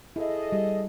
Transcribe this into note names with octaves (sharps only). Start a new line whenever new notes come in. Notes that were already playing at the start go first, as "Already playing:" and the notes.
E4 G#4 A4 D#5 E5
G3